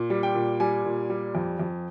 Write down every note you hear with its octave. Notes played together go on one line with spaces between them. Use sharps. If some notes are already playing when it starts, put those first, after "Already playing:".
Already playing: A#2
G3
G5
A#2
G3 G#5
A#2
G3
F2
F2